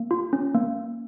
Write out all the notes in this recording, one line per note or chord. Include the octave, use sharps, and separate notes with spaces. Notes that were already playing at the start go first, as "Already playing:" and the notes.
Already playing: A#3
F4
C#4
A#3